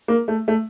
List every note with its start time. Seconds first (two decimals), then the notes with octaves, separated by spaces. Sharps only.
0.08 A#3
0.28 A3
0.48 A3